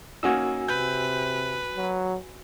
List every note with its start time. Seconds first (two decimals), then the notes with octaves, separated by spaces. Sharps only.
0.23 A#3 C#4 D#4 F#4 G#5 E6
0.68 C3 B4 G6
1.77 F#3